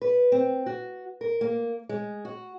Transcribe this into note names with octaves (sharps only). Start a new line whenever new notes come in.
B4
C4
F#4
A#4
A#3
G#3
F#4